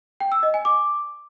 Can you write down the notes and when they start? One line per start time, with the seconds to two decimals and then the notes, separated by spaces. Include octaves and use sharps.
0.20 G5
0.32 E6
0.43 D#5
0.54 G#5
0.65 D6